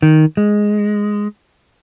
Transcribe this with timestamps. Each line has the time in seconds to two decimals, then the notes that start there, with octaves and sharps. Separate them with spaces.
0.02 D#3
0.37 G#3